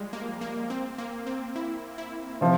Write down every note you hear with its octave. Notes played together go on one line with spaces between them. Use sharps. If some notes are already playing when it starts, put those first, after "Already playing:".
Already playing: F3 G3 G#3
A#3
A#3
C4
A#3
C4
E4
E4
C3 F3